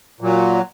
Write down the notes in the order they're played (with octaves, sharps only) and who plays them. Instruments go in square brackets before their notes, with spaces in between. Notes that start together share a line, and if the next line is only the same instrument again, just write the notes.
[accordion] A#2 F#3